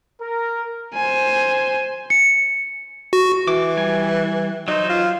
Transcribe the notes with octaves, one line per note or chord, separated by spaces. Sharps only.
A#4
C5 G#5
C#7
F#4
E3 D6
G3 G#5
F#3 D#4 C5
F4